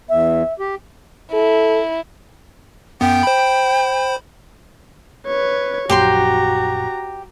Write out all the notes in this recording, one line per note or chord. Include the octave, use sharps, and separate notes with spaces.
E2 E5
G4
E4 A4
F#2 B3 G5
C5 B5
B4 C#5
A#1 F#2 F#4 G4 C5 A#5 C6